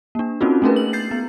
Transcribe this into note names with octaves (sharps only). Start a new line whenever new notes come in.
A#3 D4
A#3 C4 C#4 D#4 F4 F#4
A3 B3 C#4 G#4 A#4 B4
F#7
G6 A6 C7
B3